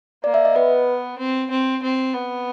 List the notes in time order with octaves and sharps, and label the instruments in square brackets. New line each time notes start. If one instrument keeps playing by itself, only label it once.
[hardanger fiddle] A#3 [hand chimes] D5
[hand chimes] E5
D#5
[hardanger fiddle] B3 [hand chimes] B4
[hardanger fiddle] C4
C4
C4
B3